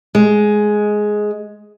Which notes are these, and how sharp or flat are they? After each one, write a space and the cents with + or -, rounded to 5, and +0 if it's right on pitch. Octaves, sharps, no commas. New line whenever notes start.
G#3 +10